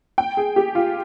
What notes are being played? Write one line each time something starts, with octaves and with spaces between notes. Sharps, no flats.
G5
G#4
G4
F4